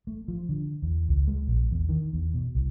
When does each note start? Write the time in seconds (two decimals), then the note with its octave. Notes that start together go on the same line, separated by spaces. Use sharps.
0.07 A3
0.28 F3
0.49 D3
0.82 E2
1.09 C#2
1.28 G#3
1.47 A#1
1.71 E2
1.89 D#3
2.13 E2
2.34 B2
2.55 C2